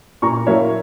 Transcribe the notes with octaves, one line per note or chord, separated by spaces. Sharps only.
A#2 A#5 C#6
F#3 A#3 E4 C#5 E5